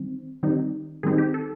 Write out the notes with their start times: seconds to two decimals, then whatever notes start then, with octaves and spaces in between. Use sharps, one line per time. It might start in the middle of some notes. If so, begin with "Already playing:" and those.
Already playing: D#3 G3 C4
0.43 D#3 G3 C4 D#4
1.03 D#3 G3 C4 D#4 G#4
1.18 G4
1.34 A4